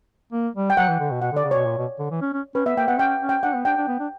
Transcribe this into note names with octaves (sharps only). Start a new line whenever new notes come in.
A#3
G3
G5
F#3 F#5
E3
D3
B2
B2 F#5
D3
D5
C#3
B2 C#5
A#2
B2
D3
E3
C#4
C#4
C#4 B4
B3 E5
A#3 G5
B3 F#5
C#4 G5
C#4
G5
D4 F#5
B3
D4 G5
D4
B3
D4